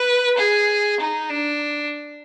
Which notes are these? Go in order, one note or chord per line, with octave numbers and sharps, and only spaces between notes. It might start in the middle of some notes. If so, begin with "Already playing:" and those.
Already playing: B4
G#4
D#4
D4